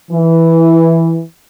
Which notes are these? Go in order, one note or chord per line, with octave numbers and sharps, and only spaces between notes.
E3